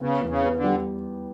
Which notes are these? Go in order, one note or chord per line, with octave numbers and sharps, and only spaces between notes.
C#3 B3
E2
C#3
B3
D3
G3